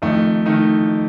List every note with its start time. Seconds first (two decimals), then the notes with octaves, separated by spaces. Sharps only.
0.02 F2 D#3 A3 D#4
0.46 D#3 A3 D#4